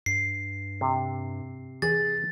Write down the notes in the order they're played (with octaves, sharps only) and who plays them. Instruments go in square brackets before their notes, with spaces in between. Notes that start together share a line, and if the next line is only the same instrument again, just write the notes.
[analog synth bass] G2 [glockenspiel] C7
[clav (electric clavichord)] C3
[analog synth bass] E3 [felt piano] G#4 [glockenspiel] A6